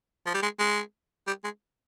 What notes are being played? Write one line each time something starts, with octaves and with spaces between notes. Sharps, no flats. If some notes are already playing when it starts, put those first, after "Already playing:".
F3
G3
G#3
G#3
G3
G#3